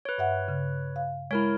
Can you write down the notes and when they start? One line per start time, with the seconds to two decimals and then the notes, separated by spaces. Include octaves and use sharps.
0.05 B4 C#5
0.18 G2 E5 F#5
0.48 C#3
0.96 F5
1.31 G#3 E4 A#4 C#5